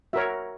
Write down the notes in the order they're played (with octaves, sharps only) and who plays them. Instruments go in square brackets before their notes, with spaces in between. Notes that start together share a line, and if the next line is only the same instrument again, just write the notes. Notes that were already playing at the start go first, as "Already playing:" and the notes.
[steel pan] F#4 A#4 C#5 E5